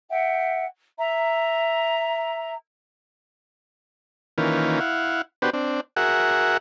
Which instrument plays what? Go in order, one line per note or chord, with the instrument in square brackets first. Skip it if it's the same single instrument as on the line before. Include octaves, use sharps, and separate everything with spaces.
[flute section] E5 F#5 G5
E5 A#5
[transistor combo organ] D#3 E3 A#3 C#4 F4 B4
E4 F5 F#5
B3 D4 F#4 G4 B4 C5
C4 D4
F#4 G#4 A#4 E5 F#5